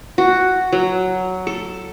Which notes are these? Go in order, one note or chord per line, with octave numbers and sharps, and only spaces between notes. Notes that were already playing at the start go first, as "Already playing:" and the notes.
F#4
F#3
A4